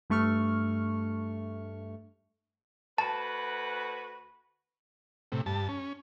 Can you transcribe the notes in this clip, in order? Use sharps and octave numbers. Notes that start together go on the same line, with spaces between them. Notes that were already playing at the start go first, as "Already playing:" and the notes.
G2 A3 C#6 F6
D2 F#4 B4 A5 B5
A2 C3
G2 A5
C#4